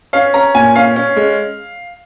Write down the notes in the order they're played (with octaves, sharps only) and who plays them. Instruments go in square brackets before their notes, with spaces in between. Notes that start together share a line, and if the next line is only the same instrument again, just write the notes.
[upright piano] C#4 F5
C#4 A#5
A#2 G#5
C#4 F5
C#4
G#3